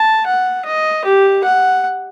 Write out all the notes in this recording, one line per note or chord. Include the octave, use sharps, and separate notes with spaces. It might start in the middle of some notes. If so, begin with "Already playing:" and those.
Already playing: A5
F#5
D#5
G4
F#5